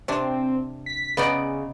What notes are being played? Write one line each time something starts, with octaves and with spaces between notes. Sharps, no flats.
C3 C4 D4
B6
C#3 B3 D#4 D5